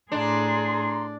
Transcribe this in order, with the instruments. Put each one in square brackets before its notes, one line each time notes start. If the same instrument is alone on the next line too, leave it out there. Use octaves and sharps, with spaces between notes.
[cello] A2 G#4 [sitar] D4 [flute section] A#5 C6